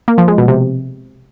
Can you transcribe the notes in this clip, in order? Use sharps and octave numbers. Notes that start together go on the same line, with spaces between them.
A#3
F3
G#3
B2
C3